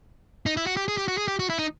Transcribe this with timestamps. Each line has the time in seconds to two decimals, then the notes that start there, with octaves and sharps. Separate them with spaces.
0.46 D#4
0.57 E4
0.67 F#4
0.77 G4
0.88 G#4
0.98 G4
1.08 F#4
1.18 G#4
1.28 G4
1.39 F#4
1.50 E4
1.59 D#4